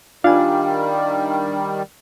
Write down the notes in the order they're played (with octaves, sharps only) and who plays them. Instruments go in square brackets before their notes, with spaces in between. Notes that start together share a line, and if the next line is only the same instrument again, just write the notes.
[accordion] D#3 G3 [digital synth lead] D4 [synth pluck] F4 G#5 [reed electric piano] F5